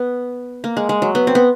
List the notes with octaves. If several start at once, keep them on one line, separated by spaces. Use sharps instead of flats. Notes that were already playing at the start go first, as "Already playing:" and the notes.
Already playing: B3
A#3
G#3
G#3
F#3
B3
C4
B3